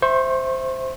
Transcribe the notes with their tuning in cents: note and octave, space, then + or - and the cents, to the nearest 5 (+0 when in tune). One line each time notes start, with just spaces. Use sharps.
C5 +0 E5 +0 C#6 -35